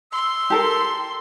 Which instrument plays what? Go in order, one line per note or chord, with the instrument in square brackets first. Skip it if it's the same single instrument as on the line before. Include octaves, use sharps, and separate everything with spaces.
[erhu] C6 [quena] E6
[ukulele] G4 A4 A#4